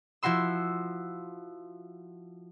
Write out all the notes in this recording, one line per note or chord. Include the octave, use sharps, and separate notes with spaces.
F3 E4 F#4 C6 E6